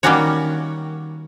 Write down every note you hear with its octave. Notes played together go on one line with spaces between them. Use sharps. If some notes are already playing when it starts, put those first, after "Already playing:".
D#3 G3 A#3 C#4 F#4 C#5